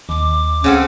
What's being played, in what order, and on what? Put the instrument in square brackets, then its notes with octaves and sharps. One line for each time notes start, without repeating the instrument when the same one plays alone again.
[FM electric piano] D#2 [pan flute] D6
[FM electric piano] C#2 F#5 E6 [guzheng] C#3 C4 A4 [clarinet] C#4